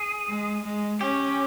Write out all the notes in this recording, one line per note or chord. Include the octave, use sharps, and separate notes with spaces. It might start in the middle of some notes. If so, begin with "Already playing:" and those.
Already playing: G#4
G#3
G#3
C#4 G4